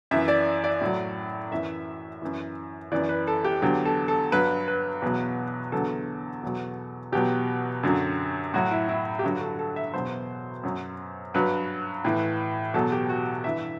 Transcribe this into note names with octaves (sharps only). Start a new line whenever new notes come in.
F#2 E3 E5
D5
D5
A2 F#3
F#2 E3 E5
F#2 E3
F#2 E3 D5
B4
A4
G4
E2 D3 F#3 G4
A4
A4
G2 F#3 B4
B4
E2 B2 F#3
E2 D3 F#3 A4
E2 B2 F#3
E2 B2 F#3 G4
F#2 D3 F#3
A2 F#3 F#4
E4
E4
G4
G2 D3 F#3 F#4
A4
A4
E5
E2 B2 F#3 C5
F#2 F#3
G2 F#3 B4
A2 E3
E2 B2 F#3 A4
G4
F#4
G2 E3 E5